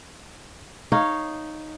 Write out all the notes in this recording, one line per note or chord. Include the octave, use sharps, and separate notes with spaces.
D#4 C#5 F5